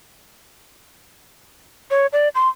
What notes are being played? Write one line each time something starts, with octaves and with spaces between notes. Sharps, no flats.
C#5
D5
C6